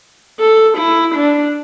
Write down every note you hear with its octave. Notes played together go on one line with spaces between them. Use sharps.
A4
E4
D4